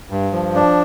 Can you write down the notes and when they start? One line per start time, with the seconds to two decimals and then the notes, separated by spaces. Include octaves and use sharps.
0.11 G2
0.33 F3
0.55 D4